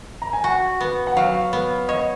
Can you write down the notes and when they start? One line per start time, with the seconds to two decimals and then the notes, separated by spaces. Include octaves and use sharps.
0.22 A#5
0.33 G#5
0.44 F#4 F#5
0.81 B3
1.07 F#5
1.17 F#3 F5
1.53 B3
1.89 C#5 D#5